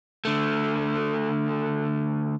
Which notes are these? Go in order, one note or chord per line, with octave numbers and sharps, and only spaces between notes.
D3 A3